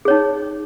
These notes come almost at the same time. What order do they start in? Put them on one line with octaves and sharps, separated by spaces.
G#4 C#5 D#4